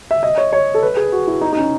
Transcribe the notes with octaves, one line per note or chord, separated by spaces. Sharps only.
E5
D#5
C#5
C#5
A4
B4
G#4
F#4
E4
D#4
D#4
C#4